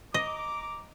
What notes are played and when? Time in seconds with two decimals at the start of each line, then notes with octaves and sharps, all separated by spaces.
0.14 D#5 A#5 D6